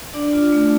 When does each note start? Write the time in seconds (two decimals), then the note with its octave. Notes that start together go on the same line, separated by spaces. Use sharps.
0.14 D4 D5
0.33 F4
0.52 A3